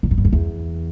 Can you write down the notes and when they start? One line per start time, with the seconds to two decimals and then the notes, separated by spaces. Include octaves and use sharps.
0.03 A#2
0.11 G#2
0.18 G2
0.25 F2
0.33 E2